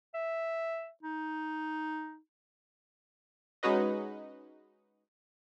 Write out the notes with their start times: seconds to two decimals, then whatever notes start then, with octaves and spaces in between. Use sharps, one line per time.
0.14 E5
1.03 D#4
3.63 G#3 C#4 D#4 F#4 B4 D#5